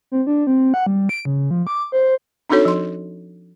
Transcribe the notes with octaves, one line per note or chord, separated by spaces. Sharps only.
C4
D4
C4
F#5
G3
D7
C#3
F3
D6
C5
C4 D4 D#4 F#4 A4 C#5
F3 C6